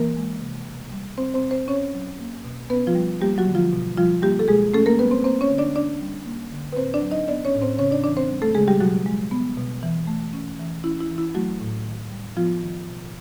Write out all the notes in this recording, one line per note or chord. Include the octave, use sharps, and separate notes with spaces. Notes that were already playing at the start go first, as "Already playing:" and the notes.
Already playing: E3 A#3 A#4
G#3
C3
B2
G3
C4 C5
C4 C5
B2
C4 C5
C#4 C#5
F#3
A#3
B2
B3 C#4 B4
F3 F4
G3
G3 A#3 G4
F#3 F#4
D3
F3 F4
B2
F3 G3 F4
G3 A#3 G4
A4
B2 G#3 G#4
A3 C#4 A4
A#3 A#4
G3 B3 B4
C4 C5
A#3 C4 C5
C#4 C#5
D3
D4 D5
C#4 D4 D5
G3
A#3
D3
B4
A2 C4 C5
D4 D5
F#3
D#4 D#5
B3 D4 D5
C#4 C#5
A2
C4 C5
C#3 C#4 C#5
D4 D5
E3 D4 D5
C4 C5
G3
A3 A4
C#3 G#3 G#4
G3 G4
B2 F#3 F#4
G#3
B3
B2
E3
A3
C#4
E3
C#4 E4
E4
E3
E4
F#3 A3 F#4
A2
D#3
G3
F3 B3 F4
D#3
B2